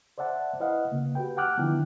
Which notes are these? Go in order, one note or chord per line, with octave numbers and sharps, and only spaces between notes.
C5 D5 E5 F#5 A5
E4 B4 D#5 F5 F#5
C#3 A#3
F#4 G4 B4 G5
F#5 G5 A5 D6 F6 F#6
D3 D#3 F3 B3 D4 E4